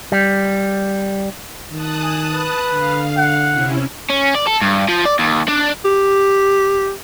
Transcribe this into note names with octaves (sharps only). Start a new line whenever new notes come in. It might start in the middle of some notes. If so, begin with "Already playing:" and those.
G3
D#3 A5 D#6 F#6
G#5
B4
D3 F5
F#5
C3 C#4 E4
C#4
D5
A4
G2
F3
D5
D#2
D4
G4